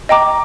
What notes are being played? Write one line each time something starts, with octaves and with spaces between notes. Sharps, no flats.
D#5 G5 A#5 D6